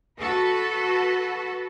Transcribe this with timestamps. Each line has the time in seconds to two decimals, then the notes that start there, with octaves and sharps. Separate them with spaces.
0.19 F#4 A4 B4